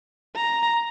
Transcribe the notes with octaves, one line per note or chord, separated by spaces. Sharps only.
A#5